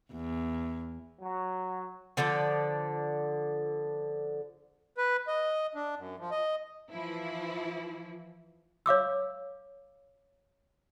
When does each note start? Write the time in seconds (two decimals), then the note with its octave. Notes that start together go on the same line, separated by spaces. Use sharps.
0.12 E2
1.21 F#3
2.17 D3 F3 A4 D5
4.97 B4
5.27 D#5
5.75 D4
5.97 F#2
6.19 F3
6.31 D#5
6.91 E3 F3 E4
8.86 C#5 F5 D6 E6